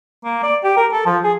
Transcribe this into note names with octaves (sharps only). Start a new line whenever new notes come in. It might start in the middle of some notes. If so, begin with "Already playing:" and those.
A#3
D5
G4
A#4
A4
F3
G#4